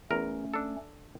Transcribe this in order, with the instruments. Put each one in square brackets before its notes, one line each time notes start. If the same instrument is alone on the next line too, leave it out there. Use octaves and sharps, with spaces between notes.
[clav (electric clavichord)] E2 A#4 [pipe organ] A3 C#4
[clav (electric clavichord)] D4 A4